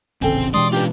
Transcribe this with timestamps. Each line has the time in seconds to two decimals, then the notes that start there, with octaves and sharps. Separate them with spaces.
0.22 D#1 A1 C#3 C4 A4 G5 G#5
0.54 B2 E3 G#3 D4 G4 D5 C6 D#6
0.72 C#4 D4 F4 G4 B4 D5